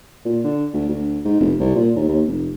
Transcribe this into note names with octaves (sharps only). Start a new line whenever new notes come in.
A#2
D3
D2
D2
G#2
F1
C2
A#2
D#2
D#2
F1